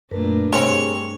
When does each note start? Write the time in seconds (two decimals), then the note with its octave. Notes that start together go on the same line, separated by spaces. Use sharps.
0.11 F#2 A#2 A3 D4 A#4 B4
0.53 G2 G3 G#3 C4 G#4 A#4 C#5